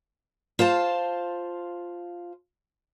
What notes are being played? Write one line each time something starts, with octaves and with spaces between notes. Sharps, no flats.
F4 C5 F5 A5